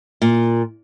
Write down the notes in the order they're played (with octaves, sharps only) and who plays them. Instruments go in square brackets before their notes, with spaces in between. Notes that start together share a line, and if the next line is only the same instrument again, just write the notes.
[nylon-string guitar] A#2